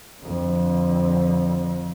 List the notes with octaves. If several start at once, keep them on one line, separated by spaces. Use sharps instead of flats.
F2 D3